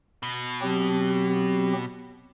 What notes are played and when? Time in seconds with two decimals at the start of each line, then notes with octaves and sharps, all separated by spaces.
0.23 B2
0.62 F#3 C4 G4